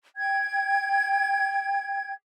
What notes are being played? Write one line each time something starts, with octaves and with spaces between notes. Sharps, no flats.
G5 G#6